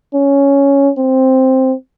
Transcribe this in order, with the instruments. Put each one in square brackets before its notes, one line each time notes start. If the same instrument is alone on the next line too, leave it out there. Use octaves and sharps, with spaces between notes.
[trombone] C#4
C4